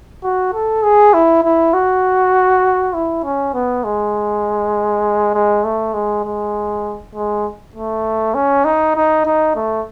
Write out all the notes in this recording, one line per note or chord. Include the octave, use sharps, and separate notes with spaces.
F#4
A4
G#4
E4
E4
F#4
E4
C#4
B3
G#3
G#3
A3
G#3
G#3
G#3
A3
C#4
D#4
D#4
D#4
A3